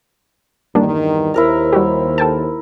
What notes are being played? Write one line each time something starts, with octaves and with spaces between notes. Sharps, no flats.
E2 G2 D#3 G3 A#3 D4
D#2 E4 A#4 C5 A#5
G3 F#4 G4
A4 G5 A5